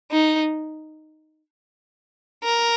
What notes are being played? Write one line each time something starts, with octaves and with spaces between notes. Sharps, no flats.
D#4
A#4